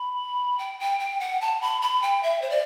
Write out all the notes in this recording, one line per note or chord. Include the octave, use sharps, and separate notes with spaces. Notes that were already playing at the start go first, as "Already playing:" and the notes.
Already playing: B5
G5
G5
G5
F#5
A5
B5
B5
G5
E5
C5
D5